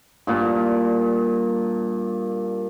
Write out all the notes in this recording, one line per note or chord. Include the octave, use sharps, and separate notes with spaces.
G2 A#2